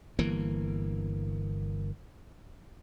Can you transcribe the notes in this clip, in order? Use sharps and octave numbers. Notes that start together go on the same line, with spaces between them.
G1 E3 A#3